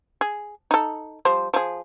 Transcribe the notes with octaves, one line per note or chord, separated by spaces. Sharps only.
G#4
D#4 A4
F3 G3 C5
F3 G#4